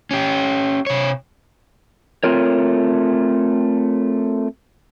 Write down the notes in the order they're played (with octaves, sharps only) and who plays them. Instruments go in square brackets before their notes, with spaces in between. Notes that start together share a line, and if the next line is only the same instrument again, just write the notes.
[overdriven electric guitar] C#4 G4
C3 C#5
[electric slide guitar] A3 C4 F4 A#4 C#5